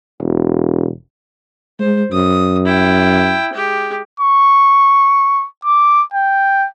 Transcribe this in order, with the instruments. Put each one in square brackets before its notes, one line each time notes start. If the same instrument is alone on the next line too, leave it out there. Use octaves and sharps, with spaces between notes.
[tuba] E1
[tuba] G#3 [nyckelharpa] C5
[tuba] F#2 [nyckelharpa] D#6
[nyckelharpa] E4 G5
G#3 G4
[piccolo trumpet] C#6
D6
G5